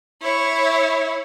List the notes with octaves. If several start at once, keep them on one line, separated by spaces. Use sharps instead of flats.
E4 C#5